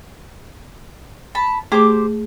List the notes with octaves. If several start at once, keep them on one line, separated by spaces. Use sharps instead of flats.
A5 B5
A3 G4 G#4 C5 D6